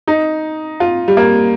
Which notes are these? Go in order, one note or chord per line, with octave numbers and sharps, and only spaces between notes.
D#4
F4
G3
A#3